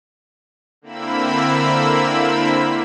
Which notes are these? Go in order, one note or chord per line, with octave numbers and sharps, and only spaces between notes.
D3 A#3 C4 E4 B5 E6